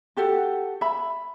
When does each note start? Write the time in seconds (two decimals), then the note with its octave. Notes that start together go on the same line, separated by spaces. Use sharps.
0.17 F#4 G4 A4 F#5
0.81 E5 B5